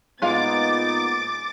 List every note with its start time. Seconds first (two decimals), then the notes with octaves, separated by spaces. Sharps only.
0.22 A#2 G#3 B3 D#4 F4 F5 D6 A6